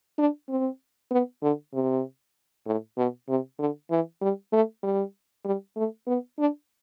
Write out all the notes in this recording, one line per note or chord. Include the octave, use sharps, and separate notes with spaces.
D4
C4
B3
D3
C3
A2
B2
C3
D3
E3
G3
A3
G3
G3
A3
B3
D4